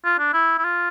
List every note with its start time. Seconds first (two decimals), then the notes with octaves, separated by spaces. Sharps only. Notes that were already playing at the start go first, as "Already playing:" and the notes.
0.04 F4
0.19 D4
0.34 E4
0.59 E4
0.64 F4